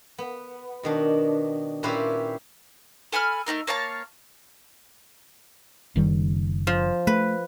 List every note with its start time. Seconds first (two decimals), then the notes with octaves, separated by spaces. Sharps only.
0.18 B3
0.83 B2 D#3 D4
1.83 A#2 C#4 E4 G4 B4 C5
3.12 A4 G#5 B5 F6
3.46 A3 C#4 D#4 A#4
3.67 A#3 C#5 F5 A5
5.96 F#1 D#3 G3
6.67 F3
7.07 A3 B4